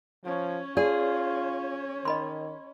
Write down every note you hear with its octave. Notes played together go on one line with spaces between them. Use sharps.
F3 C#4 C#5
F4 G#4 D5 A5
D#3 D#5 B5 C6